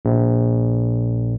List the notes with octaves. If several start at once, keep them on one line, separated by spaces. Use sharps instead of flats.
A#1